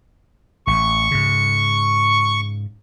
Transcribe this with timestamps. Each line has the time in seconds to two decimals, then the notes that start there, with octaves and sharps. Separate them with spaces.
0.67 A1 C#6
1.11 G#2 C#3